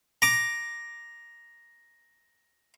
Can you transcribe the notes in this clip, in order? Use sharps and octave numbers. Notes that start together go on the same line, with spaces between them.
A#5 D6